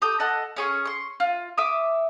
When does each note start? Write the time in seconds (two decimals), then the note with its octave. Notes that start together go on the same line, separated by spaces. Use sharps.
0.02 G4 A4 D#6 G6
0.20 A4 D#5 F#5
0.56 C#4 G#4 C#6
0.85 C6 C#6
1.20 F4
1.58 E5 D6 D#6